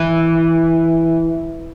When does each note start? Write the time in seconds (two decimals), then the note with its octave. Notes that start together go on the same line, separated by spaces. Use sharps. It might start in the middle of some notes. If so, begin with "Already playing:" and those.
Already playing: E3